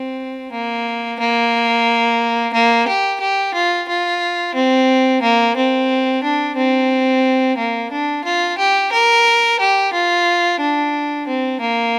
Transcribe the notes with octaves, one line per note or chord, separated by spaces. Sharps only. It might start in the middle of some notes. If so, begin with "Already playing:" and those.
Already playing: C4
A#3
A#3
A#3
G4
G4
F4
F4
C4
A#3
C4
D4
C4
A#3
D4
F4
G4
A#4
G4
F4
D4
C4
A#3